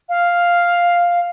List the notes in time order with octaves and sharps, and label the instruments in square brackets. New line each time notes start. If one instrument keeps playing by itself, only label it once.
[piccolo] F5